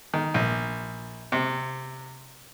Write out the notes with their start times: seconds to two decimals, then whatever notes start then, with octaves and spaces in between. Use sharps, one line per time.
0.14 D#3
0.34 A#1
1.32 C3